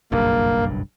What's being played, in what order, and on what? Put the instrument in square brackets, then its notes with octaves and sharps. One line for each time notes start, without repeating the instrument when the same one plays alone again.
[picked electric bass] F#1 B1 G2 [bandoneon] A#3